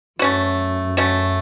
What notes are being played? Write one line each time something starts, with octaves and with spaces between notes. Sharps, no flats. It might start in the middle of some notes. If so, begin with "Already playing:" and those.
F#2 A3 C#4 F#4
A3 C#4 F#4